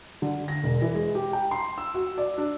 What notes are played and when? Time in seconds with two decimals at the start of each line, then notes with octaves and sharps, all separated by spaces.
0.22 D3
0.48 A#6
0.63 E1
0.82 E3
0.94 G#3
1.15 G4
1.33 G5
1.51 C6
1.78 E6
1.94 F#4
2.18 D5
2.38 D4